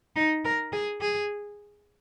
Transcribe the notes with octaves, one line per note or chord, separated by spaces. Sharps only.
D#4
A#4
G#4
G#4